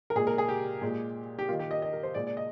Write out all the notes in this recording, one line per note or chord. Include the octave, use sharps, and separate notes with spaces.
A#4
A#2 G#3 G#4
A#4
G#4
G4
A#2 G#3
G4
D#3 A#3 F4
G4
D#5
D#5
A#4
C5
A#2 G#3 D5
D5
D#5